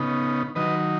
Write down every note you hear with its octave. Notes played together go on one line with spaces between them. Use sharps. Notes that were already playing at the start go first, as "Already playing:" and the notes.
Already playing: C#3 B3 D#4
D#3 F#3 D#4 B4 D#5